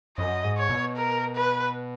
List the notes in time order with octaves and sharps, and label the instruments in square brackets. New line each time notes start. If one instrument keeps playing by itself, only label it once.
[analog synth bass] F#2 [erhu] D#5
[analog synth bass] G#2
[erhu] C#5
[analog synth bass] B2
[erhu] A#4
B4